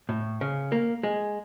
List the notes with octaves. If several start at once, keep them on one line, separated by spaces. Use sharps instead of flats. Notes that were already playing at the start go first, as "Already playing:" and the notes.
A2
C#3
A#3
G#3